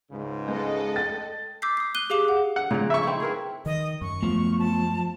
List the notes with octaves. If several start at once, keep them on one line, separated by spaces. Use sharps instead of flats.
C#2 G#2 C#3
G#3 B3 A4 D#5
G5 A6
D6 E6 G6 B6 C7
D#6 C7
F#6 D#7 G7
G4 G#4 F5 D6 E7
F#5
F#5
A#2 C#3 F3
E5 C#6
C4 D#4 E4
G#4 A#4 B4
D#3 D#5
F#2 C#6
F3 A3 B3
A5